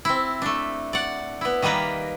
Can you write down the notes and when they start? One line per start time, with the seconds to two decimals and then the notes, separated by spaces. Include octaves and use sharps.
0.05 C4 E4
0.42 A3 D4
0.93 D5 F#5
1.41 B3 E4
1.62 D#3 G3 A#3 B4 A#5